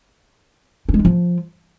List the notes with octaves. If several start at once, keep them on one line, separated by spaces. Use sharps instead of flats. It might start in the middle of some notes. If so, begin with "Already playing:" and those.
D4
G#3
D4
F3